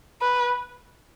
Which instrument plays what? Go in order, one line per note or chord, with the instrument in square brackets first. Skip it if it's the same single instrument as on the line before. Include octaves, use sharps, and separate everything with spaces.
[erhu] B4